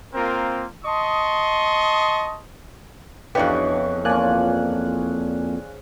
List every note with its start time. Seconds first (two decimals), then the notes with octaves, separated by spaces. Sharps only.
0.14 A#3 C4 F4 A#4
0.84 D#5 A5 C6 C#6 D#6
3.35 F2 C#3 E3 B3 D4 G4 D#5 C#6
4.05 F3 A#3 C#4 D5 G#5 F#6